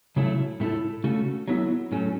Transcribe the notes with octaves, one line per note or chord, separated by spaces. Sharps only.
C#3 F#3 A3 E4 A4
A2 A3 E4 A4
C#3 A3 C#4 F#4 A4
F#3 B3 E4 A4
A2 F#3 C#4 A4